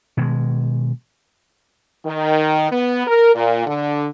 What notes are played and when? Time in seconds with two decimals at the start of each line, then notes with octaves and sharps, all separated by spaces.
0.17 B2 D#3 G#3
2.06 D#3
2.71 B3
3.07 A#4
3.35 A#2
3.67 D3